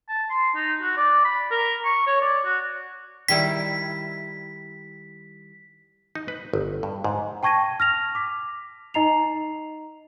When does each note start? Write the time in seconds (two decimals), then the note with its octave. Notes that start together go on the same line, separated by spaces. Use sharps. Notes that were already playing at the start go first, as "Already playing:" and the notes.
0.09 A5
0.31 C6
0.56 D#4
0.82 F#4
0.98 D5
1.25 B5
1.51 A#4
1.85 C#6
2.07 C#5
2.22 D5
2.46 F#4
3.28 D#3 G3 E4 B6
6.15 D#4
6.28 B4
6.54 G1
6.83 G2
7.04 G#2
7.43 G5 A5 C#6 G#6 A#6 D#7
7.80 F6 A#6 F7
8.15 D6 B6
8.94 D#4 D#5 A#5 C7 F7